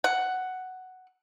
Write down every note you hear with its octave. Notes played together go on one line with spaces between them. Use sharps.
F#5